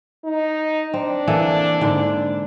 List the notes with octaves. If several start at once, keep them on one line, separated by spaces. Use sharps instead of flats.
D#4
C4 D4
E3 A#3 A4
G#2 D3